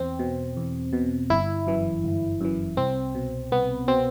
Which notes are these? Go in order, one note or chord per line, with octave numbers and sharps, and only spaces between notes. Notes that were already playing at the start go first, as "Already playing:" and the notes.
Already playing: E2 C4
B2
E2
B2
G1 E4
F#2 E3
G1
F#2 E3
C2 C4
B2
C2 B3
B2 C4